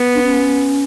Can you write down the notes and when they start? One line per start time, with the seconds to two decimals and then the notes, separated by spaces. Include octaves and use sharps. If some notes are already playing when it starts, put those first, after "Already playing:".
Already playing: B3
0.15 D4
0.23 C#4